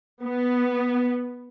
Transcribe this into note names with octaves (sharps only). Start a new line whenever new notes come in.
B3